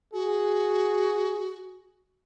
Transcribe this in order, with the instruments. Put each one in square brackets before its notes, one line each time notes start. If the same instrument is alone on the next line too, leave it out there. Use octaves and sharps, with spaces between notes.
[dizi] F#4 [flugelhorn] G#4